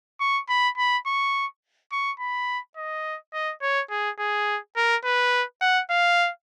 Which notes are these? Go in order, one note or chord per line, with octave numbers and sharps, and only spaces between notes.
C#6
B5
B5
C#6
C#6
B5
D#5
D#5
C#5
G#4
G#4
A#4
B4
F#5
F5